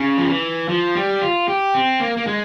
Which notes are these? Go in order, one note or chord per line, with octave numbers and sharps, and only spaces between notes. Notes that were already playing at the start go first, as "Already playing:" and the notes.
Already playing: C#3
F3
E3
F3
G3
F4
G4
C4
A#3
A#3
G#3